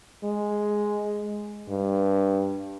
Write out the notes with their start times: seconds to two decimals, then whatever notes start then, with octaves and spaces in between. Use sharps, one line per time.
0.24 G#3
1.69 G2